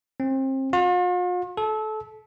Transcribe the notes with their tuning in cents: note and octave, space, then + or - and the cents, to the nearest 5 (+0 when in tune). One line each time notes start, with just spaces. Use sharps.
C4 +30
F4 +45
A4 -25